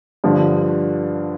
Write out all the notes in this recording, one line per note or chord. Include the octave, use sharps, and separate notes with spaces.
G2 D3 F3